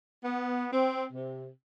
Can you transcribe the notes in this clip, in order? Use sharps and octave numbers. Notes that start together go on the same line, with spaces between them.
B3
C4
C3